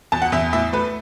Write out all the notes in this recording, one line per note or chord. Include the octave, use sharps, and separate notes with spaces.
E2 A5
F#5
E2 E5
A2 E5
A3 B4